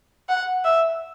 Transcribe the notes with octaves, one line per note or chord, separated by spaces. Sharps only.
F#5
E5